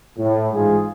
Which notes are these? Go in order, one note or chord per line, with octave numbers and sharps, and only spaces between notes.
A2
A1 G#2 G#3 F4 G#4